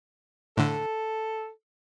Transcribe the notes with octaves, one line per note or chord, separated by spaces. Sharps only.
A2 D3 A4